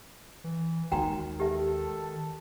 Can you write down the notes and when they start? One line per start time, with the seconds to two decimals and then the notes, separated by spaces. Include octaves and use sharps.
0.44 E3
0.92 D#2 D#3 G#3 F#4 G5 A#5
1.40 G4 A4 E5